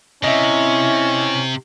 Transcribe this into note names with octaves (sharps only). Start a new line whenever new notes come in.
C3 C#4 E4 D#5 E5